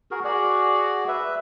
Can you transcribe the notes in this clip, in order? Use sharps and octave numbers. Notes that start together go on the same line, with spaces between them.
F#4 G#4 A#4
F#4 G#4 D5
B4 E5